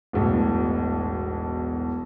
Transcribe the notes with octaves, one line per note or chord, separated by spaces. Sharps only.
E1 B1 A2